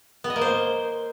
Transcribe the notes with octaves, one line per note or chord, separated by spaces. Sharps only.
B3
D#5
A#3
C5